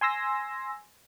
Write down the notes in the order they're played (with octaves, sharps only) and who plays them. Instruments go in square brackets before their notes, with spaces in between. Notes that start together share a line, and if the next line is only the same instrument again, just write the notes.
[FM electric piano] G#5 C6 E6 A#6